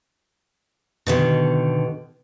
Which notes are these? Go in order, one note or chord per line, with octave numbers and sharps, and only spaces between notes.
B2 D3 D#3